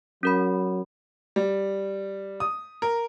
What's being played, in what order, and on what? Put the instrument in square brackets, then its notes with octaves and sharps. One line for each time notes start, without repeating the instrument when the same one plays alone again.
[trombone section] F#3 [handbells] C#4 A#4 B5
[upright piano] G3
D#6
A#4